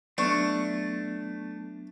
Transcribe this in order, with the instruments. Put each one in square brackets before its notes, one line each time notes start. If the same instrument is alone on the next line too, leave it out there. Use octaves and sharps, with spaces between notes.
[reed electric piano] F#3 B3 [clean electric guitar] A3 [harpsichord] D4 [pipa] C#6